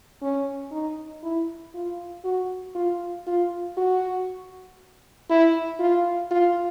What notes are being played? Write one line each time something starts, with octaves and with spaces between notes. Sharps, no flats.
C#4
D#4
E4
F4
F#4
F4
F4
F#4
E4
F4
F4